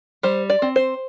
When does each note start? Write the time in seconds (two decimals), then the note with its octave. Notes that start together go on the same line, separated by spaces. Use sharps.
0.23 G3 C5
0.50 D5
0.62 C4
0.76 C5